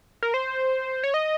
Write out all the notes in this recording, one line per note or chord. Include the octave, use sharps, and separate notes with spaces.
A#4
C5
C#5
D#5